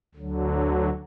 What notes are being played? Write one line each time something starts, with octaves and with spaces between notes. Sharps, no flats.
D2 D3 F#3